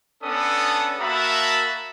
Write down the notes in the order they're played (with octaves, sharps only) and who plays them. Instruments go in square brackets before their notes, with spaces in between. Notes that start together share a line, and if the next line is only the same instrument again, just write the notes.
[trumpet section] B3 C#4 D4 A4 D#6
A#3 F#4 A#4 E5 A5 B5